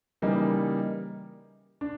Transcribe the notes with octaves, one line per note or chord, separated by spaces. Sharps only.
C#3 E3 G3 A#3 D#4
D4